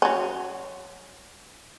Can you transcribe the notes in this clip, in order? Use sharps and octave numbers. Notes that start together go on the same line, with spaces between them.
F#3 C#4